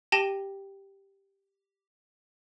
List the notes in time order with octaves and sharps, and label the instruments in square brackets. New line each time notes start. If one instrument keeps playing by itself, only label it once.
[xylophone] G4 G5 A5 A#6 D#7 G7